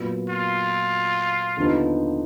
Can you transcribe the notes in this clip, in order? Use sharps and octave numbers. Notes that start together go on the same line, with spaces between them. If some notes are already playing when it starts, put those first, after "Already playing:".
Already playing: A#2 F#3 B3
F4
D#2 D3 F3 B3 D#4